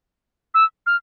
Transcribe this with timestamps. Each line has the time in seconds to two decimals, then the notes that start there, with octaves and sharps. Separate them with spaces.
0.54 E6
0.86 F6